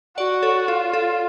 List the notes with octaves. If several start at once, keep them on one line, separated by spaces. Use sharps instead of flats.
F#4 D5 F#5
A4 C#5
F4 A4
A4